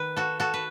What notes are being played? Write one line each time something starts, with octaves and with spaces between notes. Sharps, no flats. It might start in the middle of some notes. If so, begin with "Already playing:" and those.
Already playing: D#3 B4
F#4 A4
F#4 A4
B4